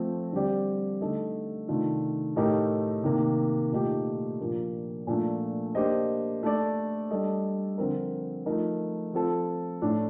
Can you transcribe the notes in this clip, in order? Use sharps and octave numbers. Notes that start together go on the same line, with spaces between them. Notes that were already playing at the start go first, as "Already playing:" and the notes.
Already playing: F3 A3 C4
D3 G3 C4 G4 D5
D3 A3 D#4 A4 D#5
C3 D#3 A3 D4 F4
A2 A3 D#4 G4 A#4
C3 D#3 A#3
A#2 A3 D#4 G4
A#2 F3 A#3 D4
A#2 F3 A3 D4
A#3 D4 G4 C5 D#5
A3 D4 A4 D5
G3 D4 A4 D#5
D3 F3 C4 F4 A#4
F3 A3 D#4 A#4
F3 C4 F4 A4
A2 A3 D4